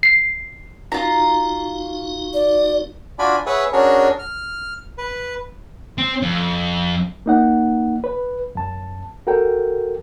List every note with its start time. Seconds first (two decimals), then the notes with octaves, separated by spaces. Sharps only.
0.03 C7
0.92 D#4 F4 F#4 A#5
2.33 D5
3.19 D4 F4 F#4 D5 G#5 B5
3.46 G#4 B4 C#5 E5 F#5
3.73 C#4 D4 F#4 G#4 A#4 C#5
4.19 F6
4.98 B4
5.98 C4
6.22 F2
7.26 A#3 D#4 F#5
8.04 B4
8.55 F#2 A5
9.27 F#4 A4 A#4 G5